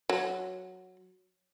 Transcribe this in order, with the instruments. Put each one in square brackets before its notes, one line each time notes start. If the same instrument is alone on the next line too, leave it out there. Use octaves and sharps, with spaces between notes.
[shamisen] F#3